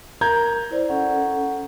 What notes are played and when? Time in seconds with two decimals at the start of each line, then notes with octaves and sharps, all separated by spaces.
0.21 A#4 A#5 G6 G#6
0.71 E4 C5 D5
0.89 C#4 A4 F#5